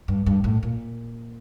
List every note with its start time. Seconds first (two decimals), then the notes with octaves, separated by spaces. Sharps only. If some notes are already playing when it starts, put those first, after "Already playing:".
0.08 G2
0.26 G2
0.44 A2
0.63 A#2